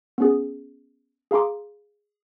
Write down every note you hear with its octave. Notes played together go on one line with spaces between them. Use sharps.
B3 C#4 G#4
G#4 F5 A#5 C6 D6